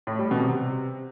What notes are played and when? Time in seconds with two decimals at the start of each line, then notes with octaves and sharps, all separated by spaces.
0.07 A2
0.19 G3
0.31 B2
0.43 C3